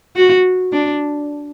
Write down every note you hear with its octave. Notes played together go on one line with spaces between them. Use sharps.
F#4
D4